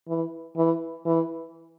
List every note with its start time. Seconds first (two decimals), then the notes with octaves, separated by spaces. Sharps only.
0.08 E3
0.57 E3
1.06 E3